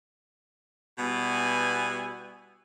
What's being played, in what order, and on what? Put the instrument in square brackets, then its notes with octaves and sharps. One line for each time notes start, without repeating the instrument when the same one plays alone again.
[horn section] B2 G3 B3 E4 G#5